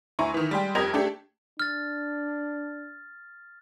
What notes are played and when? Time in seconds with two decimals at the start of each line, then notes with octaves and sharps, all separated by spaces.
0.19 D2 E4 G#5 A#5 C#6
0.34 D#3 E3
0.51 G3 G#3 G5
0.75 F2 G4 A#4 D#5 G#6 F7
0.93 A3 D4 G4 A4
1.60 D4 F6 A6